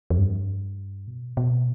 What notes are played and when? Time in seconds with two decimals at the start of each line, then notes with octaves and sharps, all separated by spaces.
0.10 F2
0.18 G2
1.07 B2
1.37 B2